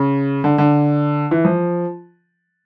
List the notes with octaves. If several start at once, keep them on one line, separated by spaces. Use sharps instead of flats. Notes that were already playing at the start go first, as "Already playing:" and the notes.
Already playing: C#3
D3
D3
E3
F3